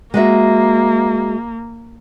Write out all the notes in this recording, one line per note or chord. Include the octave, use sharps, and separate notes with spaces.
G#3 A#3 F#4 E5